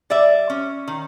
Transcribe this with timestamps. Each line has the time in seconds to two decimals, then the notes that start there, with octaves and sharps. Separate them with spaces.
0.10 G3 D5 E5
0.50 C#4
0.88 D#3